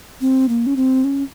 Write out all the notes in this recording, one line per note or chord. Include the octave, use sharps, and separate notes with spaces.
C4
A#3
C#4
C4
C#4